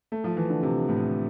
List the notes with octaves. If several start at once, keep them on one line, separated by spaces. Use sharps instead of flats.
A3
F3
E3
D3
C3
A2